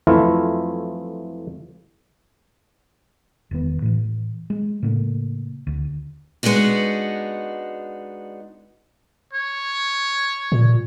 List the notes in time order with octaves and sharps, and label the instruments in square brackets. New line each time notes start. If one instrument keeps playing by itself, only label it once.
[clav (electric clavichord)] F2 E3 F#3 A3 E4 F4
[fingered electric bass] E1 D#3 B3
A2 E3
G#3
A2 C#3 A3 A#3
D2
[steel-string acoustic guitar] G#3 B3 D4 D#4 F#4
[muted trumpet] C#5
[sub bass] A#2